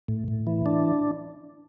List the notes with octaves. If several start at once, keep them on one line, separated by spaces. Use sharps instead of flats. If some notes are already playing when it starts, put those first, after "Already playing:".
A2
A2
E3
D4